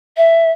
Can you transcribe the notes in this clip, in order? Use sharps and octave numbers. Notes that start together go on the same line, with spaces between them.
E5